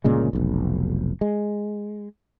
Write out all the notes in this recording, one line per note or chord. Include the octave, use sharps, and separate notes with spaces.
G1 A#2 C#3 G#3
F1 B1
G#3